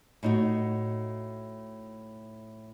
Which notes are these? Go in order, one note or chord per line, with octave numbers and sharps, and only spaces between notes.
A2 D#4 F#4